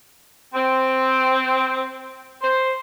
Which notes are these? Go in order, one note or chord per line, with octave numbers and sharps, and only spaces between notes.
C4
C5